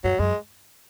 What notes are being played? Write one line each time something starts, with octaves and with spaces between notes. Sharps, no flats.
F#2 F#3
F#2 G#3